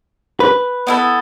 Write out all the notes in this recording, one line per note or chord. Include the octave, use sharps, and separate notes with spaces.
B4
B3 E4 A4